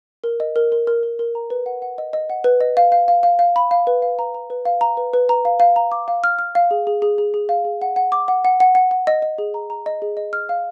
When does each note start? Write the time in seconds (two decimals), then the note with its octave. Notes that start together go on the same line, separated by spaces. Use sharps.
0.24 A#4
0.40 D#5
0.56 A#4
0.72 A#4
0.87 A#4
1.03 A#4
1.19 A#4
1.35 A#5
1.50 B4
1.66 F#5
1.82 F#5
1.98 D#5
2.13 D#5
2.30 F#5
2.44 B4
2.61 D#5
2.77 F5
2.92 F5
3.08 F5
3.23 F5
3.39 F5
3.56 B5
3.71 F5
3.87 B4
4.02 F5
4.19 A#5
4.34 A#5
4.50 B4
4.65 F5
4.81 A#5
4.97 B4
5.14 B4
5.29 A#5
5.45 F5
5.60 F5
5.76 A#5
5.92 D6
6.08 F5
6.24 F6
6.39 F6
6.55 F5
6.71 G#4
6.87 G#4
7.02 G#4
7.18 G#4
7.34 G#4
7.49 F5
7.65 G#4
7.82 F#5
7.96 F#5
8.12 D6
8.28 F#5
8.45 F#5
8.60 F#5
8.75 F#5
8.91 F#5
9.07 D#5
9.22 D#5
9.38 G#4
9.54 A#5
9.70 A#5
9.86 D#5
10.02 G#4
10.17 D#5
10.33 F6
10.49 F5